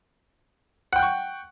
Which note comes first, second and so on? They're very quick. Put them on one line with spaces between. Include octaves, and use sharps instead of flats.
F#5 G5 F#6 C#6